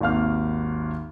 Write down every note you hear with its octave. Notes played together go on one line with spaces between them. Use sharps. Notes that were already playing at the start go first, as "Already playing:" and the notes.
G#1 D#2 F5 F6